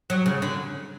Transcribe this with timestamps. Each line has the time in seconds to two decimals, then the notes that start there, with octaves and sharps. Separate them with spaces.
0.10 F#3
0.26 C#3
0.42 D3